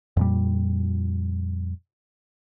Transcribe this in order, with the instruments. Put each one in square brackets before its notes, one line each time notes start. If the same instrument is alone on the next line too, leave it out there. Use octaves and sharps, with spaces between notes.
[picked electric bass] F2 A#2 G3